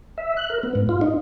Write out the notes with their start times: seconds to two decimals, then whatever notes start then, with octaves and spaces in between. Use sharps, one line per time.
0.18 E5
0.37 F#6
0.50 A#4
0.63 B3
0.75 G#2
0.89 F4
1.01 D#4